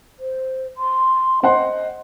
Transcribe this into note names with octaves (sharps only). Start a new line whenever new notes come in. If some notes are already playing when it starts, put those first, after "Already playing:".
C5
C6
C5 D#5 F#5 C6